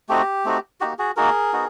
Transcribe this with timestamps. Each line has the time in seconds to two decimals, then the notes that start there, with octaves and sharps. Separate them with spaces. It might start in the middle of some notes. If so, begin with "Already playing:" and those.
0.09 A3 C4 D#4 F#4 G4
0.45 A3 C4 D#4 F#4
0.80 A#3 D#4 F#4 G4
0.99 F#4 G#4
1.16 A#3 D#4 F#4 G#4 A#4
1.53 B3 D#4 F#4